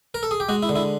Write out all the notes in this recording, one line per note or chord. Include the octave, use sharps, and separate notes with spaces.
A#4
A4
G#4
G4
G#3 F#4
E4
D3
E4